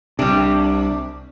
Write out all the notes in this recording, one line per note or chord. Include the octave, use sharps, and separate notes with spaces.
C2 C3 G3 D4